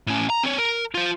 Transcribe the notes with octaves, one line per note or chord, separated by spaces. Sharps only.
A2 C#4
A#5
C4 C#5
A#4
F4 C5